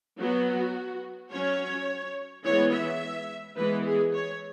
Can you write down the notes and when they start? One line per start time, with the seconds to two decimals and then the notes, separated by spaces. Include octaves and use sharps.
0.19 F#3 B3 F#4
1.32 F#3 C#4 C#5
2.45 E3 G#3 B3 C#5
2.72 E5
3.57 E3 G#3 B3 B4
3.85 G#4
4.14 C#5